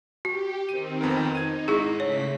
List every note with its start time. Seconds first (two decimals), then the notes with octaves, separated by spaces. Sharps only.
0.25 F#4 G4
0.69 D#3 C4 D#7
1.01 F2 B3 A#4
1.35 D#4 G#6 D#7
1.68 G#2 E4 G#4
2.00 C#3 A3 C#5 B6